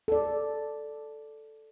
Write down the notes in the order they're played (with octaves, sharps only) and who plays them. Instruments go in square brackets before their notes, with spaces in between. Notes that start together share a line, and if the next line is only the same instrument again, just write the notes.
[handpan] A4 D5